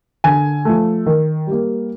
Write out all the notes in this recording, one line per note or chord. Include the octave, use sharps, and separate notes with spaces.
D3 G#5
F3 A3
D#3
G3 A#3